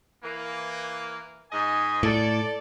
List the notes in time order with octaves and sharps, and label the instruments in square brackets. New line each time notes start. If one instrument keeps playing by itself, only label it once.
[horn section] E3 A#3
G#2 D#5 G#5
[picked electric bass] A2 [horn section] A4 D5